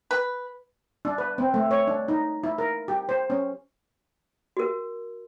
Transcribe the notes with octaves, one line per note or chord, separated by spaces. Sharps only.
B4
D4
B4
C4
A3
C#5
D4
D#4
E4
A#4
G4
C5
C#4
F#4 A#4